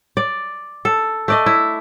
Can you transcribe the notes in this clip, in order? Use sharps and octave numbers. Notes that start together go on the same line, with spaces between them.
D5
A4
A3 D5 D#5
E4